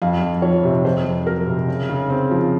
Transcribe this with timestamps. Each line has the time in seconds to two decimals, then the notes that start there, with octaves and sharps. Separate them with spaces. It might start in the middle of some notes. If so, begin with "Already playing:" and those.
0.02 F2 F5
0.22 F2
0.42 F3 C#5
0.63 C3
0.84 F2 C5
1.05 F2
1.27 F#3 A#4
1.47 C3
1.68 C#3
1.89 C#3
2.10 C4
2.31 F3